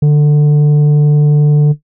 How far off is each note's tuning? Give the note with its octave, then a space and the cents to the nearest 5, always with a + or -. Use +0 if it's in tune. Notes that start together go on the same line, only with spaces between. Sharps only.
D3 +15